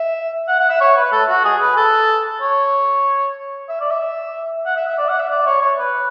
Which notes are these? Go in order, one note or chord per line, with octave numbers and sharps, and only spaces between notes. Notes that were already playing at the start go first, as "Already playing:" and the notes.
Already playing: E5
F#5
F#5
E5
C#5
B4
A4
F#4
G#4
B4
A4
C#5
E5
D5
E5
F#5
E5
E5
D5
F#5
E5
D5
C#5
C#5
B4